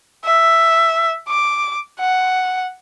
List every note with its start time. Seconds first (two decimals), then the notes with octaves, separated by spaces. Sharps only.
0.25 E5
1.28 D6
2.00 F#5